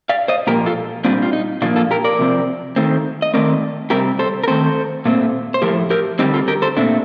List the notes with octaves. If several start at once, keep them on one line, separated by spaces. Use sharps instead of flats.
D5 F5
C5 D#5
A#2 F3 A#3 G4 A#4
F4 A4
A#2 G3 C4 D4 F4
F4
D#4
A#2 F3 A#3 D4 F4
F4 A4
G4 A#4
A#4 D5
C3 F3 C4
D#3 A3 C4
D#5
D#3 A3 C4 A#4 D5
C3 G3 C4 G4 A#4
A4 C5
A#4
D#3 A3 C4 A4 C5
A#2 A3 C4
C5
A2 F3 A3 G4 A#4
G4 A#4
D3 G3 C4 D#4 G4
F4 A4
G4 A#4
A4 C5
A#2 A3 C4 D4